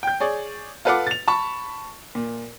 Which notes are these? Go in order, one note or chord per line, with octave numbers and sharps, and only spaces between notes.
G5 G6
G#4 C#5 D5
F4 A4 B4 F5 F#5 D6
A6 F7
A5 B5 C#6
A#2